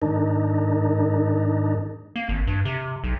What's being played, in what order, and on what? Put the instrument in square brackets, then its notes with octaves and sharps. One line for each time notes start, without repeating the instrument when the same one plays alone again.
[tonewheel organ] G#2 D#3 D4 D#4
[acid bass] A#3
G#1
G2
C3
B1